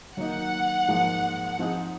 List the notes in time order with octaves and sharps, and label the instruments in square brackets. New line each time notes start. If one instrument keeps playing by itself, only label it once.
[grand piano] D#3 F#3 A#3 D#4 [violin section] F#5
[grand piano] G#2 F3 A#3 F4
F3 C4 D#4 G#4